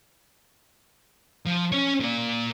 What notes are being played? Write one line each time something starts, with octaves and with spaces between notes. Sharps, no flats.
F3
C#4 C#5
A#2 D5